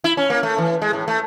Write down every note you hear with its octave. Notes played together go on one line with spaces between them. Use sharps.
E4
C#4
A#3
A3
E3
G#3
A2
A3